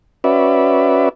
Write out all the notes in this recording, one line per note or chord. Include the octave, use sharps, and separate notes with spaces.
C#4 F#4 B4 D5 E5